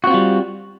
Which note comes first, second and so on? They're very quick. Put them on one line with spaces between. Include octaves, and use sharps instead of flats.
F#4 C4 F4 G3